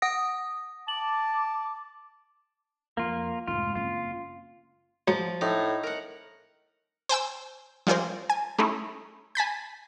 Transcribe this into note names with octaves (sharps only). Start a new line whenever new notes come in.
F#5 D#6 A#6
A5 D6 F#7
F2 A#3 F4
F1 G#2 F4
F#1 C4 F4
F3 F#3
A2 D#4
A#4 F#5
C5 G5 G#5 E6
F3 G3 F4 G#4 A#4 C5
G#5
A3 C#4 D#4 E4
G#5 A5 B5 G6